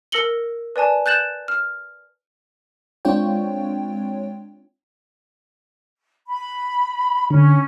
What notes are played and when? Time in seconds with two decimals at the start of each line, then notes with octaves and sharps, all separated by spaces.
0.12 A#4 E6 A#6 C#7 F#7 G7
0.76 B4 D5 G#5 A5
1.06 F#6 G6 A6 E7 F#7
1.48 F6
3.05 G#3 C4 D4 F4 C#5 G5
6.27 B5
7.30 D3 C#4